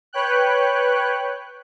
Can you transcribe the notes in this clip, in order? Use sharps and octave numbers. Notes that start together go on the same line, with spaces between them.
B4 C#5 G5 F#6